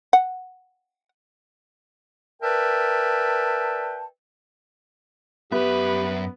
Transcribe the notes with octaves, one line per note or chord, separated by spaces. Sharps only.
F#5
A#4 B4 D5 E5 G5 A5
F#2 B3 G4 B4 E5